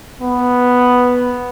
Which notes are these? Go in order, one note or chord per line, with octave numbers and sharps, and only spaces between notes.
B3